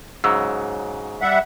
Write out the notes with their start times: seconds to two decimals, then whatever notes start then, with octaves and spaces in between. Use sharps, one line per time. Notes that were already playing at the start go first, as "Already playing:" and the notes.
0.24 G#2 C#3 F#3 E6
1.21 G3 E5 F#5